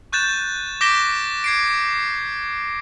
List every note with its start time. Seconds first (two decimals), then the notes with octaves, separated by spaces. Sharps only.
0.12 C#6 F#6 G6 A6 E7
0.81 D6 G6 A#6 B6 D7 G7
1.44 G#6 C7 D7